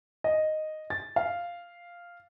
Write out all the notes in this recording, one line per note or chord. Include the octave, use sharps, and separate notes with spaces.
D#5
A6
F5